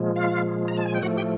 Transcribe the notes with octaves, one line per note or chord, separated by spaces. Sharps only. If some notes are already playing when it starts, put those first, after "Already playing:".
Already playing: A#2 F3 G#3
F4 F5
A#5
A5
G#5
G5
A2 F3 A3 F#4 F#5
G4 G5